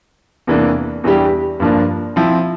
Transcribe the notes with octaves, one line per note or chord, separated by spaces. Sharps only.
E2 C3 E3 A#3 D4
E2 E3 G3 D4 G4
G2 F3 A#3 D4
F3 C4 E4